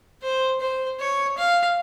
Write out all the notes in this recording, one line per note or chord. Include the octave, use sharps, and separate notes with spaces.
C5
C5
C#5
F5